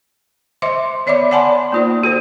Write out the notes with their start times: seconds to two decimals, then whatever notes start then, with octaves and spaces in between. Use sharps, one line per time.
0.62 C5 D#5 E5 C6 D6
1.06 B3 C#5 D5 E5 B5 D6
1.31 D5 F#5 G#5 A5 B5 C6
1.72 A#3 D#4 F4 C5 D5
2.03 F#4 A4 C5 E5